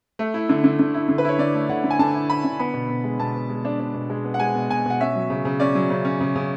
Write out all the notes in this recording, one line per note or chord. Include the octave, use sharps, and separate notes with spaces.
A3
E4
D3
D3
D3
E4
D3
B4
E4 C#5
D3 D5
A3
D3 F#5
D3
G#5
D3 A5
E4
E4 B5
D3
B3 B5
B2
B2
G#3
B2 A5
B3
G#3
D4
D4
B2
G#3
B3
F#5
G#3 G#5
B2
B2 G#5
B2 F#5
C#4 E5
F#3
C#3
C#3
C#4 D5
F#3
C#3
C#4
C#3
C#3